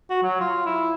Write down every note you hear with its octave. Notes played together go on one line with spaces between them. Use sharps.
F#4
F#3
F4
E4